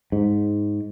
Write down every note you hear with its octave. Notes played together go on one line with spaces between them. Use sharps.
G#2